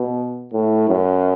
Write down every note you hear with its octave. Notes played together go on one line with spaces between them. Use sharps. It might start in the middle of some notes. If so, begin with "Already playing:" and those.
Already playing: B2
A2
F#2